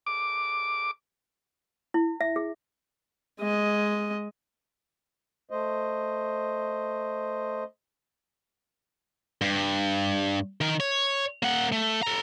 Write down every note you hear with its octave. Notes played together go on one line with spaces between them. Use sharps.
D6
E4
E5
G#4
G#3 D#5
A3 C5 D#5
G2
D#3 A#4
C#5
A#3 F#5
A3
A4 A#5